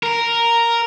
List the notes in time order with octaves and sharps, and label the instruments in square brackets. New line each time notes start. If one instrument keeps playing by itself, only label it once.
[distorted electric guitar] A#4